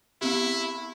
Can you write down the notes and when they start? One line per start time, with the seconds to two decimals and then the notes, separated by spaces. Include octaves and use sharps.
0.22 B3 C4 E4 G4